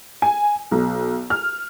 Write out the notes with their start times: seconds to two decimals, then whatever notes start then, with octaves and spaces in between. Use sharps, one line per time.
0.22 G#5
0.71 B1
1.30 F6